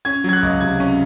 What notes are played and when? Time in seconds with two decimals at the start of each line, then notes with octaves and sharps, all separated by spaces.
0.05 C#4 G#6
0.24 F#3 G#6
0.33 F#6
0.43 C#2
0.61 C3 G#6
0.80 C#4